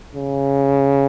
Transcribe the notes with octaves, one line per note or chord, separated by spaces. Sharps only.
C#3